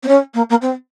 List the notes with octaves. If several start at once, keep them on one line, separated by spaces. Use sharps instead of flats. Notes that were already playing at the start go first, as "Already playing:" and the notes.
C4
C#4
A#3
A#3
C4